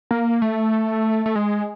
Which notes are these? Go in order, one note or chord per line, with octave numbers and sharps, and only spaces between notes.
A#3
A3
A3
G#3